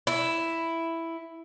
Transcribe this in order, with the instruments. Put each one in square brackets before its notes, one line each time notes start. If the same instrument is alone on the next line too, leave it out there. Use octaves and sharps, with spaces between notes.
[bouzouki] E4